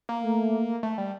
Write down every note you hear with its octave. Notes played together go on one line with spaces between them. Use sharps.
A#3
A3
A3
G3